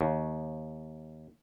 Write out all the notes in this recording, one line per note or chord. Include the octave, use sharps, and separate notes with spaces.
D#2